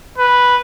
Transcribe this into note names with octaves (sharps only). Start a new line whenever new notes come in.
B4